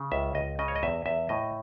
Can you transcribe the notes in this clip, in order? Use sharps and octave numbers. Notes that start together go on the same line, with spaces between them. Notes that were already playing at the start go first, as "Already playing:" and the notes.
Already playing: C#3
C#2 E5
C#2 D#5
C#3 D#5
C#5
D#5
E2 E5
E2 E5
A2 D#5